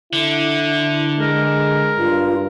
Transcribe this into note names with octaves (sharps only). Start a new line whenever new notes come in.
D3 E4
G#3 A#4
G2 F4